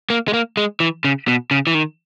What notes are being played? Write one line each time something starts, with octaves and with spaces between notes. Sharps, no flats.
A#3
G#3
A#3
G#3
E3
C#3
B2
C#3
E3
D#3